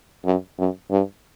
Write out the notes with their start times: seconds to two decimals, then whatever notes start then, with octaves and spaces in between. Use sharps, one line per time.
0.25 F#2
0.58 F#2
0.90 G2